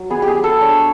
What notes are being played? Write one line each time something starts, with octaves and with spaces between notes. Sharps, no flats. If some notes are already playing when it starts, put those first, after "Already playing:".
Already playing: F#3
B3 G#4
G4
G#4
F#3
A4
D4 C#5